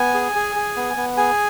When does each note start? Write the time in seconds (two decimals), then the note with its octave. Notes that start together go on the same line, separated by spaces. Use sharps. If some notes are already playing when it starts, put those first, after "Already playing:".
Already playing: B3 G#5
0.14 G#4
0.35 G#4
0.56 G#4
0.76 B3
0.97 B3
1.17 G#4 G#5